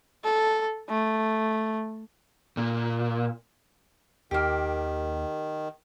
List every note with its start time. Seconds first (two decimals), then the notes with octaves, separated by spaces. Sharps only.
0.24 A4
0.89 A3
2.57 A#2
4.31 D#2 D#3 A#3 G4